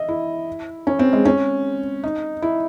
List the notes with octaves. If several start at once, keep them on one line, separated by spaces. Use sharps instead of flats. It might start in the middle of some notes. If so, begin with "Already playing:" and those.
Already playing: D#5 E5
E4
C#4
C4
G#3
C#4
D#4
E4